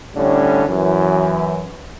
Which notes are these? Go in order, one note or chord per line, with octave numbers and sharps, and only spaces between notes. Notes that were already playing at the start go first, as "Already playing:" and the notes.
A2 D3 G3 C#4
F#2 E3